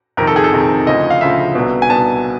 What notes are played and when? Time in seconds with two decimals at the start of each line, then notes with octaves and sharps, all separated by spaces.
0.17 F2 C3 D#3 A#4
0.27 A4
0.36 G#4
0.44 A4
0.53 F2 C3 D#3
0.87 D2 C#3 F3 D#5
1.10 F5
1.21 D2 C#3 F3 E5
1.55 C2 B2
1.82 G#5
1.90 C2 B2 A5